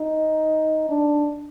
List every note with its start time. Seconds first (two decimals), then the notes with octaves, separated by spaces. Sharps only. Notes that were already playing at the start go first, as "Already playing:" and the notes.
Already playing: D#4
0.89 D4